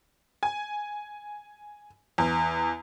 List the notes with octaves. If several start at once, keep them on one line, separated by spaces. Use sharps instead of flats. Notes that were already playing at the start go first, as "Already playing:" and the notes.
G#5
E2